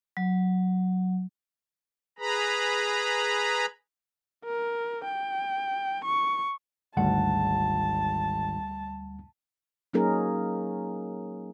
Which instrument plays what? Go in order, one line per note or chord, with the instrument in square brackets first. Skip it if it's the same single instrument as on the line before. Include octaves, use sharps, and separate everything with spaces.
[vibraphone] F#3
[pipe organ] G#4 B4 A#5 B5
[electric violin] A#4
G5
C#6
[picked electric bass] G#1 [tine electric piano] D2 G3 F#5 [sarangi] A5
[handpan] F#3 A#3 C#4 D#4 G#4 A#4